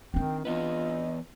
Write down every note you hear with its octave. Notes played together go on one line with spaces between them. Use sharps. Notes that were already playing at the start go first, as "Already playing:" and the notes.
D#3 C4 D4 G5
E3 B3 F4 B4 D#5